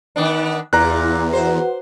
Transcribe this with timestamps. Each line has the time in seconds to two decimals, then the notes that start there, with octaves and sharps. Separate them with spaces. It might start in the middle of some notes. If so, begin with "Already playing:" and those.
0.16 D#3 B3 D4
0.73 E2 A#2 A#5 F#6
1.33 F#4 B4 C5 F#5